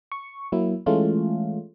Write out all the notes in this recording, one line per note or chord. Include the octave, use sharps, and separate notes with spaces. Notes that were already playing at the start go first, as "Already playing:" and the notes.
C#6
F#3 A#3 E4
E3 G#3 A3 C#4 F4